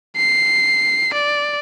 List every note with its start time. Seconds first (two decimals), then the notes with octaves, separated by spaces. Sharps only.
0.16 C7
1.13 D5